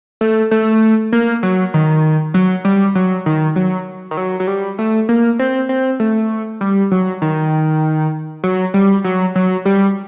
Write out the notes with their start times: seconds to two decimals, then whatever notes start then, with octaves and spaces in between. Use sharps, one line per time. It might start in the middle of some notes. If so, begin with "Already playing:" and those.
0.21 A3
0.51 A3
1.12 A#3
1.43 F#3
1.74 D#3
2.34 F#3
2.65 G3
2.95 F#3
3.26 D#3
3.56 F#3
4.11 D#3
4.17 F#3
4.40 F#3
4.47 G3
4.79 A3
5.09 A#3
5.39 C4
5.69 C4
6.00 A3
6.61 G3
6.91 F#3
7.22 D#3
8.44 F#3
8.74 G3
9.04 F#3
9.35 F#3
9.65 G3